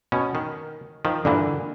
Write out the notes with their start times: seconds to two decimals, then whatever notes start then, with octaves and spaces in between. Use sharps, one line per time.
0.12 B2 C#4
0.35 D#3
1.05 D#3 F3
1.25 G2 A#2 D3 E3